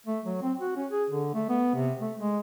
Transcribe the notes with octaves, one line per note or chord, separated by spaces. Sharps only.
A3
F#3
C4
F#4
C#4
G#4
D3
A3
B3
C3
A3
G#3